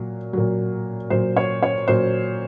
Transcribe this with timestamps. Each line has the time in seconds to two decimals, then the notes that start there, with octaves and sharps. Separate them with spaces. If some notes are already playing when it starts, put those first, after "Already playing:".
Already playing: A#2 F#3
0.33 A#2 F#3
1.10 A#2 F#3 C5
1.37 C#5
1.63 C#5
1.88 A#2 F#3 C5